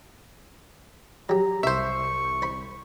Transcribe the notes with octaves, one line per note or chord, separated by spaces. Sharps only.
F#3 G4 A#5
C2 C5 E5 C#6
C5 B5